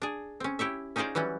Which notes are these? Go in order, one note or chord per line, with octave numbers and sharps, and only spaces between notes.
D4 G#4
C4 C#4
E4 G4 C#5 E5
C#4 D#4 F4 G#4 C5 D5
E3 F#3 G3 C#4